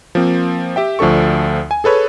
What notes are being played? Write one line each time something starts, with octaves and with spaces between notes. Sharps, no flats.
F3 A#3 C4
G4 E5 G5
D2 F3 D4 A4 C#6
G#5
G#4 A4 B4 C#5